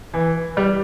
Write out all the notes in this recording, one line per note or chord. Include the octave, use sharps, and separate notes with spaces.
E3
G3